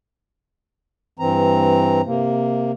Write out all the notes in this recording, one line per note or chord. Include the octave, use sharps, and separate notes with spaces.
G2 E3 C4 A#5
C3 A#3